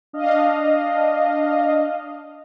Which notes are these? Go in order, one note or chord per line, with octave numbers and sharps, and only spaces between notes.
D4 D#5 F5